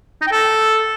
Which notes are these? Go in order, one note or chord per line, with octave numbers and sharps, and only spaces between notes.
D#4
G5
A4